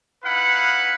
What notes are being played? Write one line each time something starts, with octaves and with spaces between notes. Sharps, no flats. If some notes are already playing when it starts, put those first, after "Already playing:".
D#4 E4 B4 F5 F#5 B5